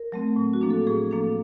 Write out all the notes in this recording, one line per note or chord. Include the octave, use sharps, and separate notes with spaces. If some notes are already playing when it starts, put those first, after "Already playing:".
Already playing: A#4
F#3 A3 C4
A2
F#4
F3 A#3 D4
A4
A2 G#4
F3 A#3 D4 A4